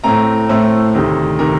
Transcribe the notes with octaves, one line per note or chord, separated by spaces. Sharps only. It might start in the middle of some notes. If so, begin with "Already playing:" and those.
A2 A3 C4 A#5
A2 A3 C4 C5
D2 C3 D#3
C3 D#3 A#4